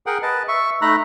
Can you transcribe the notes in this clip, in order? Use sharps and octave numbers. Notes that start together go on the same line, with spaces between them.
G#4 A#4 F#5 G5
B4 D#5 A5
E5 C#6
A3 D#4 E5 A#5 B5 F#6